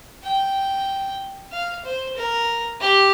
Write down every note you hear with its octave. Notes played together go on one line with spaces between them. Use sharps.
G5
F5
C5
A#4
G4